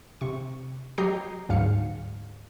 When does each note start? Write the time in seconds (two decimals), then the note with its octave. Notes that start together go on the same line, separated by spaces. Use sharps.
0.21 C3 C#6
0.98 F#3 G4 D#5 A#5 G6 C7
1.49 D2 G#2 F#3 F5 C#7